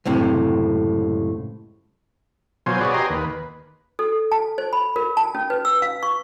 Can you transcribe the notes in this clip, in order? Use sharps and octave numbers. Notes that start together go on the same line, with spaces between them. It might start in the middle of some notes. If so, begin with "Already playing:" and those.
C#2 F#2 A2 C3
B2 F#3 F4 C5 G#5
F#4 G#4 B4 C#5 D5
G4 D#5 G#5 A#5 C6
D#2 B4
A4
A5
C5
B5
A#4
A5
C#4
B4
E6
F5
C#6